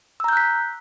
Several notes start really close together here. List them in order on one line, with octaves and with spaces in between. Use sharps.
E6 A#5 G6 F#6 B6